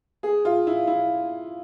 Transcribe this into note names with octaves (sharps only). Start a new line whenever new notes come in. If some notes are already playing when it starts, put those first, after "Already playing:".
G#4
F4
E4
E4